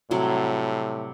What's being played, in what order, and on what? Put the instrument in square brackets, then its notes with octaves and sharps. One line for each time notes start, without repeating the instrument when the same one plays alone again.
[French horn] A2 [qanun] C3 F#3 G3